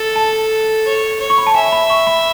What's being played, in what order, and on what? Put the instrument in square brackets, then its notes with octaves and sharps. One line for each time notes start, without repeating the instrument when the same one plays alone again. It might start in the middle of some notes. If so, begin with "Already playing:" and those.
Already playing: [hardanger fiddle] A4
[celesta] A5
[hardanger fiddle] C#5
C#5
[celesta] C#6
B5
A5
[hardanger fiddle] E5 [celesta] G#5
[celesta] B5
C#6
B5